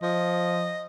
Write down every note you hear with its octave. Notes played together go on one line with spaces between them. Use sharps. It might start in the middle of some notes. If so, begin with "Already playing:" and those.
F3 D#5